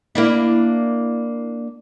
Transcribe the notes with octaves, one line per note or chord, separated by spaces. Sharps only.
A#3 D4 E4